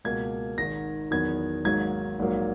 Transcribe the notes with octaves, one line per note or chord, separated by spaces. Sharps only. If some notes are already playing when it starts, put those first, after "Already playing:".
C#2 B2 A#3 G#6
G#1 G#2 D#3 A#6
E2 D#3 F#3 B3 G#6
G#1 G#2 D#3 F#3 A#3 G#6
A#1 G#2 F#3 A#3